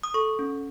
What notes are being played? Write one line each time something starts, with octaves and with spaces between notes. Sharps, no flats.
D#6
A4 C#6
C#4